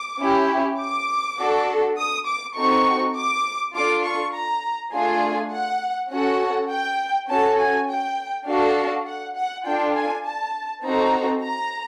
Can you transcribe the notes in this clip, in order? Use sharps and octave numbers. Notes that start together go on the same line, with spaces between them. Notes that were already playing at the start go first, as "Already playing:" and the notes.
Already playing: D6
C#4 E4 G4
D6
D4 F#4 A4
D#6
D6
C4 D#4 F#4 A4 C#6
D6
D4 F4 A4 D6
C#6
A#5
A3 D4 F4 G#4 G#5
F#5
C#4 F#4 A4 F#5
G5
C#4 F#4 A4 A5
G#5
G5
D4 F#4 A4 F5
F#5
F#5
D4 F4 A4 G5
G#5
A5
C4 D#4 F#4 A4 A#5
A#5